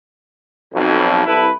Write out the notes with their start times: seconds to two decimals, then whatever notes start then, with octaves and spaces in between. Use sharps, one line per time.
0.74 B1 F2
1.26 C2 E4 A4 B4